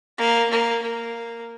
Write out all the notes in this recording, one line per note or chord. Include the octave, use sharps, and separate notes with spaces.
A#3
A#3
A#3